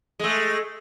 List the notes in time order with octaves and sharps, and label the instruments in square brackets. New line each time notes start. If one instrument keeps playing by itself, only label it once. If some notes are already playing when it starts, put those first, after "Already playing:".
[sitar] G#3 A3